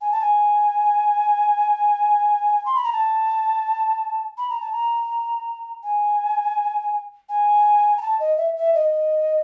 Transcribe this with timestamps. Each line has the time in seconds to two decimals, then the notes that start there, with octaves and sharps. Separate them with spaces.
0.01 G#5
0.12 A5
0.21 G#5
2.66 C6
2.75 B5
2.84 A#5
2.93 A5
4.38 B5
4.50 A#5
4.61 A5
4.72 A#5
5.83 G#5
7.29 G#5
7.98 A#5
8.02 A5
8.20 D#5
8.37 E5
8.56 E5
8.74 D#5